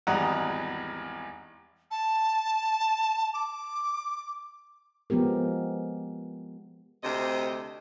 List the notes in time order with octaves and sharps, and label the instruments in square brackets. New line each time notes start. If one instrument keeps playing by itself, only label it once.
[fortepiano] G#1 E2 G3 F#5 A#5 D#6
[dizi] A5
D6
[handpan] F3 G#3 B3 G4 A#4
[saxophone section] D2 C3 C5 D#5